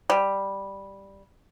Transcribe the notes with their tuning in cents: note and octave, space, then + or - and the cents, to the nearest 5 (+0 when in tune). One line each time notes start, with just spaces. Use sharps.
G3 +0